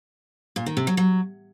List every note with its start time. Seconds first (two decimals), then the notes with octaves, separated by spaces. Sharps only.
0.56 A#2
0.66 D#3
0.77 C3
0.87 F#3
0.97 F#3